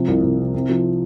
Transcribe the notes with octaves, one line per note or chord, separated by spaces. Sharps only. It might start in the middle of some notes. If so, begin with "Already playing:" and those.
Already playing: C3 F3
C2
C2
C3
C3
F3